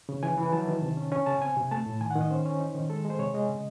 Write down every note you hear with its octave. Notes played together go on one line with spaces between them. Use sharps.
C#3
E3 G#5
E3
F#3 A5
D#3
C3
C#4
C#4 G#5
C#3 A5
C4 G#5
C3
A3 A5
A2
D#3 G#5
F#5
D#3
D#5
C#4 C5
C#4
D#4
D#3
G#3 A4
G#3
C5
C3 C#5
G#3 D#5
C#3